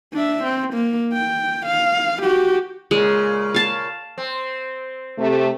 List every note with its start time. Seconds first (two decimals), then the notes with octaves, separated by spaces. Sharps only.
0.13 D4 E5
0.43 C4
0.73 A#3
1.13 G5
1.66 F5
2.23 F#4 G4
2.91 A#2 C#3 G#3
3.54 F5 A5
4.18 C4
5.18 C3 A3